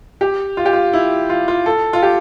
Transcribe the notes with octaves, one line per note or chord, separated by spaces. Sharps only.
G4
F4
G4
F4
E4
F4
F4
A4
F4
G4